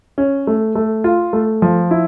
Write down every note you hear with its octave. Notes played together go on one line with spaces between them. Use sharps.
C#4
A3
A3
F4
A3
F3
E4